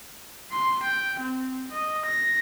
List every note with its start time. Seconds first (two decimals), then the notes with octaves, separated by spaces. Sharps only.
0.52 C6
0.83 G5
1.20 C4
1.71 D#5
2.05 A#6